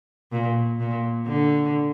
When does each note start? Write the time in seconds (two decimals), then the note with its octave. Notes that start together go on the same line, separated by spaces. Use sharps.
0.32 A#2
0.79 A#2
1.26 D3